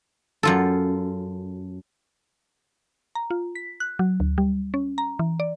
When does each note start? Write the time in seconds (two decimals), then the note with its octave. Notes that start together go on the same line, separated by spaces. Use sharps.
0.43 F#2 F4 A4
3.15 A#5
3.31 F4
3.55 B6
3.80 F#6
3.99 F#3
4.20 D2
4.38 G3
4.74 C#4
4.98 A#5
5.19 E3
5.40 D5